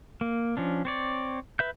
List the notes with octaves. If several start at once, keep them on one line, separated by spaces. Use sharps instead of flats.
A#3
F3 C#4 D4
C4 C#5 D5
B4 E5 G6